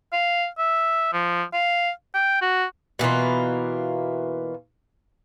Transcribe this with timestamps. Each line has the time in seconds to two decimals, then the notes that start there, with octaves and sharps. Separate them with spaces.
0.13 F5
0.58 E5
1.13 F3
1.53 F5
2.14 G5
2.41 F#4
2.99 B2 E3 A#3 F4